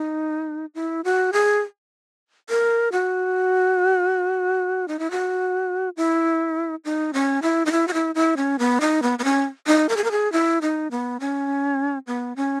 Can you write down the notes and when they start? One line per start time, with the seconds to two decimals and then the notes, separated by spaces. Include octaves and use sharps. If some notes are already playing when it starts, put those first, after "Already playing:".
Already playing: D#4
0.75 E4
1.05 F#4
1.33 G#4
2.49 A#4
2.92 F#4
4.88 D#4
4.99 E4
5.11 F#4
5.97 E4
6.85 D#4
7.14 C#4
7.42 E4
7.66 D#4
7.72 E4
7.88 F#4
7.94 E4
8.15 E4
8.37 C#4
8.59 B3
8.81 D#4
9.02 B3
9.19 B3
9.24 C#4
9.67 D#4
9.89 A#4
9.97 G#4
10.04 A#4
10.11 G#4
10.32 E4
10.62 D#4
10.91 B3
11.20 C#4
12.07 B3
12.36 C#4